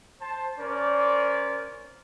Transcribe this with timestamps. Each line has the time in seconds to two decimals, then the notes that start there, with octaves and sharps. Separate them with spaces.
0.21 C5 A5
0.58 C#4 A#4 C5 D5